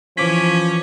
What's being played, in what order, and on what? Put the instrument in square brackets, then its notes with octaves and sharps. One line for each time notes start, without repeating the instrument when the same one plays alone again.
[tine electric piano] E3 D6 B6 [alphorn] F3 [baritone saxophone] C#4